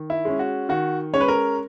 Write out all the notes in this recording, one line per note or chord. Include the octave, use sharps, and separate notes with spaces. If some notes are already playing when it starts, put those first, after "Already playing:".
Already playing: D#3
E4
G#3 C#4
F#4
D#3 F#4
G#3 C#4 C#5
B4
A#4